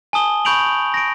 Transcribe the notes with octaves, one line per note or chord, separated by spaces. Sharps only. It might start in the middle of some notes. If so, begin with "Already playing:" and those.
G#5 A5 D#6 G7
B5 C#6 G6 D7 F7 F#7
A#6 D7